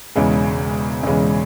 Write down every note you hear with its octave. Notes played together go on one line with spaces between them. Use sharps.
E1 E2 C#3 E3 G#3
E1 E2 C#3 E3 G#3